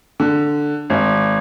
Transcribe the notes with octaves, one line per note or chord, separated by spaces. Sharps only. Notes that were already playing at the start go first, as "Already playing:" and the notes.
D3
G#1